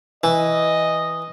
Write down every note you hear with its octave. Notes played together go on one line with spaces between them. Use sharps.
E3 D#5